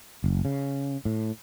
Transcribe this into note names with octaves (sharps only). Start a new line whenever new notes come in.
F#1
C#3
A2